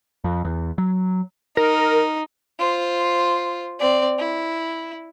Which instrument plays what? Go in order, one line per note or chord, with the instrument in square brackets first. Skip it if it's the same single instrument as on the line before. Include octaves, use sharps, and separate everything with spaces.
[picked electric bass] F2
E2
F#3
[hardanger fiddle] D#4 [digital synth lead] A#4
[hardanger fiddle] F4 C5
C4 D5
E4